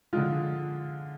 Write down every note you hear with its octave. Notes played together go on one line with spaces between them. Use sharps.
D3 F3 G#3 F4